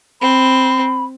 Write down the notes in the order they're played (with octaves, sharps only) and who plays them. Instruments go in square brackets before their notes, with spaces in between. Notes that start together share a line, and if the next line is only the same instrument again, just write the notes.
[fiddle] C4 [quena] B5